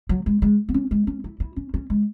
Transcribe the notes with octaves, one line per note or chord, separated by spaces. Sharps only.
F#3
G#3
G#3
B3
C#4
G#3
C#4
E4
E4
C#4
C#4
G#3